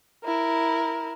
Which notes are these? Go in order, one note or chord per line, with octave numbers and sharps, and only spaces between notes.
E4 A#4